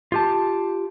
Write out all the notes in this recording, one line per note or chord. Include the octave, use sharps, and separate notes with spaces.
F4 G4 A5